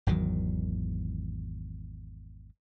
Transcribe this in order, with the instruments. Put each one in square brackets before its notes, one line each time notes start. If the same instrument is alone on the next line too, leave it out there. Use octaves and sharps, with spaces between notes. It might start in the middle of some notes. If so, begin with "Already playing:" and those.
[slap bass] G#1 E2 D#3 F#3